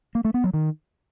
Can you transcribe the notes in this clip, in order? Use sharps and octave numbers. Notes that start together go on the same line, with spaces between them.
A#3
A3
B3
F#3
D#3